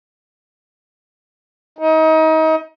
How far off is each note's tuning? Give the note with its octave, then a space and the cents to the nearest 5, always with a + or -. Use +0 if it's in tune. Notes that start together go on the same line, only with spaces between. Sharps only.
D#4 +30